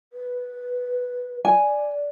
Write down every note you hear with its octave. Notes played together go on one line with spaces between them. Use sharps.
B4
D5 G#5